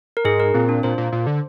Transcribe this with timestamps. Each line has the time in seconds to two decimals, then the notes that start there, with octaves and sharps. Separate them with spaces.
0.17 A#4
0.24 G#2 G#4
0.40 A#4
0.54 A#2 C4
0.69 D4
0.83 A#2 C5
0.98 A#2
1.12 A#2
1.27 D3